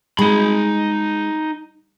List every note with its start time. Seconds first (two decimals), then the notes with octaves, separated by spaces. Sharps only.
0.19 G#3 D#4 B5